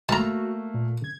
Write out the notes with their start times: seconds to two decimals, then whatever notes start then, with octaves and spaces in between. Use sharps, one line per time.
0.09 A3 A#3 F#4 A5 A#5
0.74 A#2
1.04 G#6